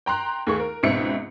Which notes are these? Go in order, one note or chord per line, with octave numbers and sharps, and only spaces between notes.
G5 A#5 C6 F#6
D#2 A3 G#4 C#6
A#4
C#2 G#2 B2 C4 E5 C#7